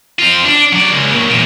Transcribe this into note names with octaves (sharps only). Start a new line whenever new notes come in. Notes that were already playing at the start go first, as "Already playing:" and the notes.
C4 F4
D4
F#3 D5
C#2
A#2 F#3
E2 A#2